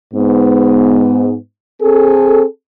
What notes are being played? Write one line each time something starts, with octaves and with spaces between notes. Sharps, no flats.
G#2 B3
C4 G#4 A4